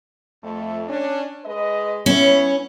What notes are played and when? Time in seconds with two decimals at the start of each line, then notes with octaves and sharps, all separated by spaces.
0.44 F2 A3
0.88 C#4 D4
1.46 G#3 B4 D#5
2.06 B3 C#4 E4 C#5